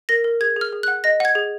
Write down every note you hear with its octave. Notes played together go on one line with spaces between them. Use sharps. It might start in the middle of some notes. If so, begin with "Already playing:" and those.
A#4 A#6
A#4
G#4 G#6
G#4 F6
G#4
F#6
F#5
D#5 A#6
F#5 G#6
G#4